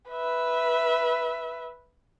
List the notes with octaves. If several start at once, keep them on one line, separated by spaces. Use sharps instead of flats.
B4 E5